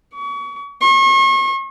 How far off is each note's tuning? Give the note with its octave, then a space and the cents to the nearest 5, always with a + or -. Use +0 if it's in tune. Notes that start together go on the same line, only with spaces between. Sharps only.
C#6 +35
C#6 -40